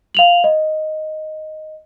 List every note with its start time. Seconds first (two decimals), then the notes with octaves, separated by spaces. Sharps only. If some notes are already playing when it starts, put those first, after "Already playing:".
0.15 F5 F7 F#7
0.44 D#5